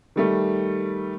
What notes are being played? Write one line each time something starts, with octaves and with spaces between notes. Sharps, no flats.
D#3 G3 A3